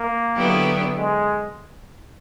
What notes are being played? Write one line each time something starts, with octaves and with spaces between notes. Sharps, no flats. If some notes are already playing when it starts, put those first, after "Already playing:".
Already playing: A#3
D3 F#3 B3 E4 G4
G#3